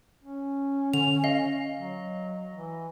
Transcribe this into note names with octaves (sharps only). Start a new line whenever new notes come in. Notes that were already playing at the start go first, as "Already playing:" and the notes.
C#4
D3 F7
D#5 F5
F#3
E3